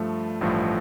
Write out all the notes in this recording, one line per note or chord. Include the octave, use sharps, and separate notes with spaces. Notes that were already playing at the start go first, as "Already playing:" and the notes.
Already playing: G2 F3 A3
A1 G2 F3 A3